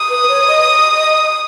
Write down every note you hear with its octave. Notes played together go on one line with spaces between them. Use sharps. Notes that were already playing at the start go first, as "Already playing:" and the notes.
Already playing: D#6
B4
C#5
D#5